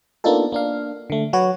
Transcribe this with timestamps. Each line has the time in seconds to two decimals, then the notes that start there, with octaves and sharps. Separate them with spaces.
0.24 A#3 B3 D4 D#4 F4 A4
0.52 A#3 D4 F5
1.10 D3 A3
1.33 F#3 F#4 B4 C#5